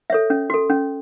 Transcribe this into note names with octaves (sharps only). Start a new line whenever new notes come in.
A4 C#5 E5
C#4
F#4 A4
C#4